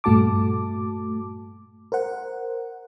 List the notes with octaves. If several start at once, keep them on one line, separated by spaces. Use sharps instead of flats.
G2 A#2 A3 F#4 A5 D6
A#4 C5 F#5